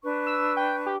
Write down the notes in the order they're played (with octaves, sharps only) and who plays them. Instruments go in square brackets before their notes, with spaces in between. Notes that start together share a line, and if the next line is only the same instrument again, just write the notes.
[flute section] D4 B4 C#6
[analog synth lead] E6
G5
G4